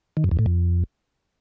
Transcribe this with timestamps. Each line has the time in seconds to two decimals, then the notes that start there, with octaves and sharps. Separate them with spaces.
0.17 D#3
0.24 F#2
0.31 E2
0.39 A2
0.46 F2